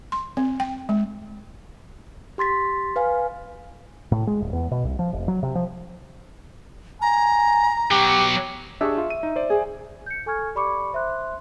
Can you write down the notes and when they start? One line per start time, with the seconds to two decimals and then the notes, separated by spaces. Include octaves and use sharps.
0.12 C6
0.37 C4
0.60 G5
0.89 G#3
2.38 G4 C6 A6 B6
2.96 B4 F5 G#5
4.12 A2
4.27 G#3
4.40 D#1
4.53 E2
4.71 B2
4.85 C2
4.99 F3
5.13 F1
5.28 F#3
5.43 C3
5.55 F3
7.02 G#5 A#5
7.91 B2 F#3 G4
8.81 D4 G4 G#4 E5 C#6
8.98 F4
9.10 D#7
9.23 D#4
9.36 C5 D5
9.50 G#4
10.06 G6 C#7
10.26 A4 G#5 C#6 F6 G#6
10.55 G4 D5 B5 C#6 D6 C#7
10.93 C5 E5 C6 F#6